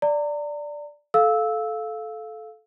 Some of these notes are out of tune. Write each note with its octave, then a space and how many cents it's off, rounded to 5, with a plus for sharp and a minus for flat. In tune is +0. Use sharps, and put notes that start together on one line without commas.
D5 +0 A#5 -35
A4 -15 F5 +0 E6 -10